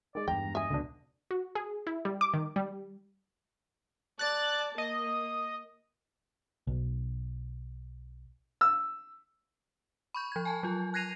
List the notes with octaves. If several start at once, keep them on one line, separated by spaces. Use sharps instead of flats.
D#3 G#3 D5
E2 G2 G5 A#5
D#5 E5 G#5
E1 C#2 B2 D3 D4
F#4
G#4
E4
G3
D6
D#3
G3
D5 A5 F#6 A6
A#3 D#5
B1
E6
B5 C#6 G6
F3 G#6
G#5 A5
F#3 F4
F#6 G#6 A#6 C7 D#7 F7